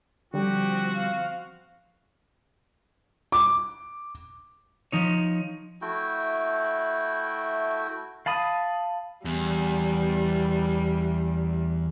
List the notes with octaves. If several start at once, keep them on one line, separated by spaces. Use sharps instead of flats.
D3 F3 G3 C4 F#4 G4
F5
D6
F3 D#4 C#5
A3 E4 F#4 G5
F5 A5 B5 D#6
E2 G3